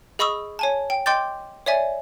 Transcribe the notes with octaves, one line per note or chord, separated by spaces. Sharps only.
G#4 D#5 B5 C#6 D#6 E6
C#5 G#5 A5
G5
D#5 G5 C6 D6 G6 A6
C#5 D5 E5 G#5